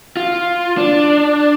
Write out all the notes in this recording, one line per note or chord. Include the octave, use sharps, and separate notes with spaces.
F4
D4